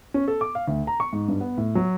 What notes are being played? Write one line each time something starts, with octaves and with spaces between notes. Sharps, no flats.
C#4
A4
D6
F5
D2
A#5
C#6
G#2
G2
B3
A2
F#3